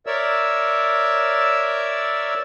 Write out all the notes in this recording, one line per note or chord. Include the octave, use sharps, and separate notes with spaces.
A#4 C#5 D5 E5 E6